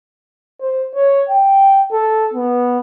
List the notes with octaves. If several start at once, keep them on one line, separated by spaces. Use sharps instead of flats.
C5
C#5
G5
A4
B3